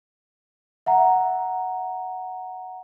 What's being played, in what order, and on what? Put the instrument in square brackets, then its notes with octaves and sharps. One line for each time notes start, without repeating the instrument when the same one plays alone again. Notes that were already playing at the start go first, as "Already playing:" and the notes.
[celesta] E5 F#5 A#5